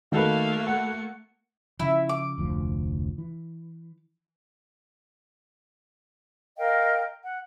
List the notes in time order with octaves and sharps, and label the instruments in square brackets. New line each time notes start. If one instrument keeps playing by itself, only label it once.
[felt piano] D#3 [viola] A3 A#3 [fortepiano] F#4 A4 B4 [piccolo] F5
[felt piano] F#5 [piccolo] C#7
[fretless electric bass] C#3 F3 [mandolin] E4
[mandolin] D6
[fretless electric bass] F1 D2 F3
E3
[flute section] A#4 D#5 F5 G5
F#5